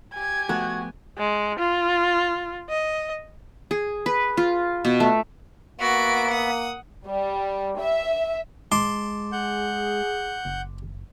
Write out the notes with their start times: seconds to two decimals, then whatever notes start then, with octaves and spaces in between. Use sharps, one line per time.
0.14 G4 G#5 G#6
0.49 F3 A3 B3 F#4
1.18 G#3
1.59 F4
2.69 D#5
3.71 G#4
4.06 B4
4.37 F4
4.85 B2
5.00 A3
5.80 A#3 B3 F#4 E5 D7
6.31 F#5 D#6
7.06 G3
7.79 E5
8.72 G#3 A5 C6 D6
9.32 G#4 F#5 G6
10.45 F#1